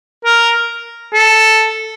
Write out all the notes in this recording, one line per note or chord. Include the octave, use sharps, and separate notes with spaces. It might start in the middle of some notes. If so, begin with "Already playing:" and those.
A#4
A4